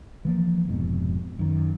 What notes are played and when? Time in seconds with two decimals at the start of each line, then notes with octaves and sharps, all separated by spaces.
0.25 E3 F3 A#3
0.68 F1 F2 G#2 B2
1.39 F#2 D#3